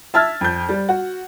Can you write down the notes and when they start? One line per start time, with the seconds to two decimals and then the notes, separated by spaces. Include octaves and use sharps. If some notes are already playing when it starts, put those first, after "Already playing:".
0.14 E5 A5 E6 F6 G#6 A6
0.41 F2 G6
0.69 G3
0.89 F#4